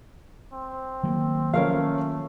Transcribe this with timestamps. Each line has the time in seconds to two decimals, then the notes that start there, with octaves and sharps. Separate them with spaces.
0.53 C4
1.03 D#3 F#3 A#3
1.53 F3 A3 C#4 A#4 F5